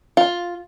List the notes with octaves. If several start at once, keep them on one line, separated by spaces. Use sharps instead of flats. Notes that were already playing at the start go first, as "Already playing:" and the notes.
F4